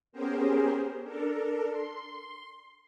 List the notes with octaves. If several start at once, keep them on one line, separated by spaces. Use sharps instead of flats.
B3 C#4 G4 G#4 A#4 C5
D4 A4 A#4
C6